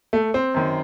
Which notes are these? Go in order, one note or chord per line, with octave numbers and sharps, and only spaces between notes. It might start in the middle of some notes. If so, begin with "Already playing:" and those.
A3
C4
F#2 D#3